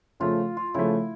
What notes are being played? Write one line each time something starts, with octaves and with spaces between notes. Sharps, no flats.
C#3 F3 A3 F4
F4
C#3 F3 A3 E4